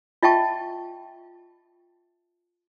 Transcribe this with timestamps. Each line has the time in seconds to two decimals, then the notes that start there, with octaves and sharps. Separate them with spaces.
0.23 F4 D#5 E5 G5 A5 C#6